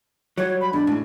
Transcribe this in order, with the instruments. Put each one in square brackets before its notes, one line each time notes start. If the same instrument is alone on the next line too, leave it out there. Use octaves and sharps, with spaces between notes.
[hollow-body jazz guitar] F#3 G3 [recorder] C#5
[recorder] B5
[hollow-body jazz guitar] E2 G#2 [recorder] D4
[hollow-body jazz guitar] A2 C#3